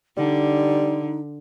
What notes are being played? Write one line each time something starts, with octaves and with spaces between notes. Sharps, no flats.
D3 G3 D#4